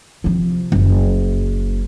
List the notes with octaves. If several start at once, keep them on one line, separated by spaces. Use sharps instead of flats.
C3 F3
F#1